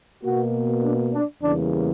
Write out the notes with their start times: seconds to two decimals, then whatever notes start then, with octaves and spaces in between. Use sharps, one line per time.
0.23 B2 A#3 F#4
0.83 D4
1.13 D4
1.43 E2 C#3 E3 G3 A#3 D4